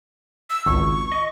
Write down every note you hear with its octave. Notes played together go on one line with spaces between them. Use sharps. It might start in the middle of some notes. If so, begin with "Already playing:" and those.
E6
G#1 C#2 C#6
D#5